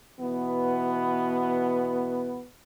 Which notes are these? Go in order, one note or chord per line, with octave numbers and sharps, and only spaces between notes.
B2 E3 B3